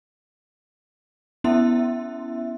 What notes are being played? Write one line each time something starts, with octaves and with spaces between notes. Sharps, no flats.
B3 C#4 E4 E5 C6